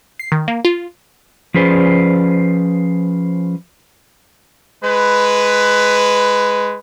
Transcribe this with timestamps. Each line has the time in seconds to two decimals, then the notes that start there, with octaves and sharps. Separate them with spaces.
0.20 C7
0.32 D#3
0.48 A#3
0.65 F4
1.54 F3 C#4 G#4 B4 C5 D5
4.84 G#3 B4